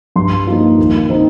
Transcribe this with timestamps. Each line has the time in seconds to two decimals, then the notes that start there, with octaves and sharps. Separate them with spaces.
0.16 G2 C6
0.47 F3 A#3 D#4
0.79 D#2
1.10 D#3 C4 D#4